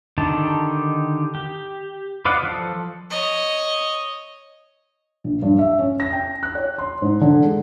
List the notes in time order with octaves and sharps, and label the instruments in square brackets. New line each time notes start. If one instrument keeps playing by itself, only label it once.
[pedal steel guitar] D3 D#3 D#4 G4 A5
G4
B4 D5 D#5 F5 F#5
F3 A4
[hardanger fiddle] C#5 D#5
[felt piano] A#1
G2
E5
C#4
A#6
G5
F#6
C#5
C6
G#2
D3
G#3